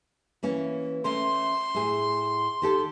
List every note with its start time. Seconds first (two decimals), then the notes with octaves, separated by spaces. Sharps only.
0.43 E3 A#3 C#4
1.04 A3 C#4 A#4 C6
1.75 A2 G#4
2.62 D#3 G4 A4